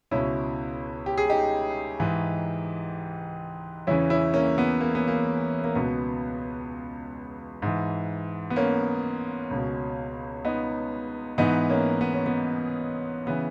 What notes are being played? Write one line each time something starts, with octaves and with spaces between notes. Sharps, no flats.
C#2 B2 C#4 E4
G4
G#4
D#4 G4
G#2 E3
E2 C#3 E3 C#4 E4
C#4 E4
A#3 C#4
B3
A#3
B3
A#3
A#3
C#2 B2 B3
G#2 E3
B3
A#3 C#4
C#2 B2
B3 D#4
G#2 E3 B3 D#4
A#3 C#4
B3
C#4
B3
C#3 E3 B3